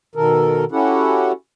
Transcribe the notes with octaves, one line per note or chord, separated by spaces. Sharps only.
B2 D#3 A4 A#4
C#4 E4 F#4 G4 A4 F#5